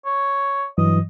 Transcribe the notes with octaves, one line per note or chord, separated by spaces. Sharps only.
C#5
G2 E3 F#3 D#5